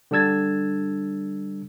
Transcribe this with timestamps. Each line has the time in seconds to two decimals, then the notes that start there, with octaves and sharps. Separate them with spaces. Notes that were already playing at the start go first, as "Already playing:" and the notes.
0.11 D3 G3 D4 E6 G#6 A6